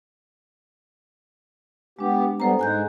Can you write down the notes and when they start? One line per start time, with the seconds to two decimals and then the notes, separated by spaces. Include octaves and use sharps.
1.99 G#3 B3 D4 G4
2.40 G3 B3 A4 C5 A#5
2.59 G#2 G#3 G#5 F#6 G6